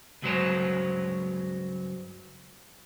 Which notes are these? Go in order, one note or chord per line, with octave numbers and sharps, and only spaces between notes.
C#2 G2 F#3 G#3 C5 C#5